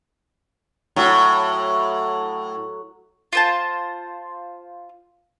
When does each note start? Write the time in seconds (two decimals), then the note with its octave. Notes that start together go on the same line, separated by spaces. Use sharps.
0.96 A2 F#3
3.33 F4 C5 A5